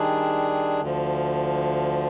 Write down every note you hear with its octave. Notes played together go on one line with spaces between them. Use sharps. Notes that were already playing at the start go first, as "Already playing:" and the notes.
Already playing: D#3 G3 D4 G#4
D2 D3 F3